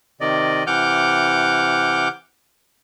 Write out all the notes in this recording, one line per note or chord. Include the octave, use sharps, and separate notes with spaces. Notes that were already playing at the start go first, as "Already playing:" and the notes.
C3 D#3 D5 D#5
C3 E3 F#5 D6 F6 G6